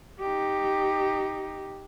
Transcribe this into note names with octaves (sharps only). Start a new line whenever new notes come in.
D#4 G4